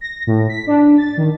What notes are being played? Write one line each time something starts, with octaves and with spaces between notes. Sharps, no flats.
A#6
A2
B6
D4
A6
D#3